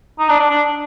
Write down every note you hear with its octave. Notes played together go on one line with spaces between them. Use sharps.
D#4
D4
D4
D4